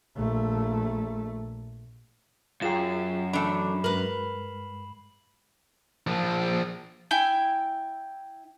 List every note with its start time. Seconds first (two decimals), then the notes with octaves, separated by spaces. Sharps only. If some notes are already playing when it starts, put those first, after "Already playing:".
0.16 A#1 A3
2.62 F#2 F4 G#4 G5 C7 E7
3.33 E3 A3 D4 B5
3.84 G2 G#3 A#4 B4 F#7
6.07 F3 D4
7.11 E4 G5 G#5